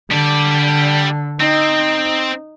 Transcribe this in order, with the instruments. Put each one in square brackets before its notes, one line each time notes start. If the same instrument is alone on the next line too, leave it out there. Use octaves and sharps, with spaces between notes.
[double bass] D3 [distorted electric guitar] G3 D5
[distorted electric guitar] C4 [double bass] D#4